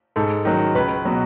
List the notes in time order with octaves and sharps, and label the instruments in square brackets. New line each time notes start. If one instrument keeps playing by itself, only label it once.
[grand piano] G#2 A4
D#3 F#3
C#2 B4
B2 F#3